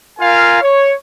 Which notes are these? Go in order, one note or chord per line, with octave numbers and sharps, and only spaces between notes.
F4 A#4 F5 G#5
C#5